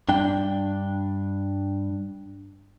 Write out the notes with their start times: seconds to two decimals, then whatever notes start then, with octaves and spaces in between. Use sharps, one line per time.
0.09 G2 D4 G5